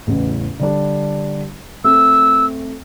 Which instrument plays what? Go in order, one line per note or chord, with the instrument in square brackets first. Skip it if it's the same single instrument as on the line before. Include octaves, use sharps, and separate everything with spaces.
[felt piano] A1 E2 C#3
D3 G3 D4
[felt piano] A3 C4 [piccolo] E6